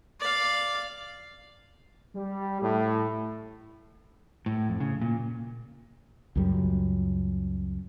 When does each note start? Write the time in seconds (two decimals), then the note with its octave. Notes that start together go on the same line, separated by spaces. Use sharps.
0.20 D5 F5
2.15 G3
2.61 A2
4.46 A2
4.69 F2
4.80 C#3
5.02 A#2
6.36 C#2 F#2 G3